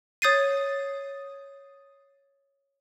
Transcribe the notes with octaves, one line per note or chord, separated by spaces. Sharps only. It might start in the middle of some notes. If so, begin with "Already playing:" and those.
C#5 D#6 G6 A6 C7 D#7